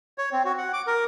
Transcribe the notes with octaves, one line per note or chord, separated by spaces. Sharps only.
C#5
C4
F#4
F#5
D6
A#4